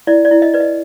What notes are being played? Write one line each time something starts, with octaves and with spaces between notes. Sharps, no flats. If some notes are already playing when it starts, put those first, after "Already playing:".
E4 D5
D5
E4
D#5
B4 D5
D#5